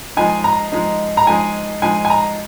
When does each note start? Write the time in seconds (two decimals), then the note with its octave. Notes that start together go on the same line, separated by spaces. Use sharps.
0.17 F3 G#3 D#4 G#5
0.44 A#5
0.72 F3 G#3 D#4
1.17 A#5
1.27 F3 G#3 D#4 G#5
1.82 F3 G#3 D#4 G#5
2.05 G#5
2.10 A#5